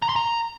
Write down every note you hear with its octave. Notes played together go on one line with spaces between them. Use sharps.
A#5
C6
A#5